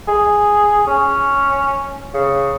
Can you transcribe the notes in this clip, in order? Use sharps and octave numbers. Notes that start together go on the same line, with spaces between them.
G#4
C#4
C#3